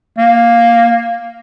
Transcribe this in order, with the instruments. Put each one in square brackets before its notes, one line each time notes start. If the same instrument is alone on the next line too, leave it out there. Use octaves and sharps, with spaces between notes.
[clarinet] A#3